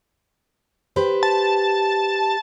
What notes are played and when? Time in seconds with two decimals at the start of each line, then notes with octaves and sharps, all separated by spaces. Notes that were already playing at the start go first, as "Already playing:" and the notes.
0.96 G4 B4 C5
1.23 A5